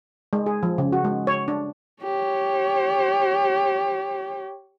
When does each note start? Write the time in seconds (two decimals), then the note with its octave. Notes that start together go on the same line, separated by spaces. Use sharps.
0.33 G#3
0.46 G#4
0.63 F3
0.78 C#3
0.92 F#4
1.05 G#3
1.27 C#5
1.48 D4
2.03 G4 C#5